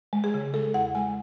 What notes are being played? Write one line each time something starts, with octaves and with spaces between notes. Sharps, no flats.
G#3
G#4
C#3
G#3 A4
E2 F#5
G#3 G#5